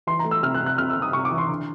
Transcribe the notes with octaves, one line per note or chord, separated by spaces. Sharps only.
E3 C6
A#5
A3
E6
C3 F6
F#6
C3
F#6
C3 F6
E6
C3
D#6
C3 C#6
D6
E3
C6
D3